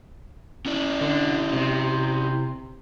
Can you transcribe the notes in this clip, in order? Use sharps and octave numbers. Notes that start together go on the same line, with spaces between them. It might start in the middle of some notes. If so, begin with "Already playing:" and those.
C#4 E4 D5
D3
C3